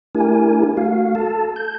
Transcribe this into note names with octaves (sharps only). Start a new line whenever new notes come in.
A3 D4 E4 G4 A#4 G#5
A3 F#4 F5
A4 A5
G6